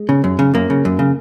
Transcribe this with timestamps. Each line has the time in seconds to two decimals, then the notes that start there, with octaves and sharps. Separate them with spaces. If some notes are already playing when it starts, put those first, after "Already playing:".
Already playing: G#3
0.09 C#3
0.24 F#2
0.39 C#3
0.54 F#2 A#3
0.70 C#3
0.85 F#2
0.99 C#3